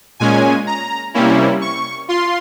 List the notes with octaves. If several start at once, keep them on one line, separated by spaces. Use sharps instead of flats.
A#2 G#3 C#4 G#5
A#5
C3 G3 A#3 C#4 E4
C#6
F4 C6